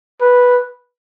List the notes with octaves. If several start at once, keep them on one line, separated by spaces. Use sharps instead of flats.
B4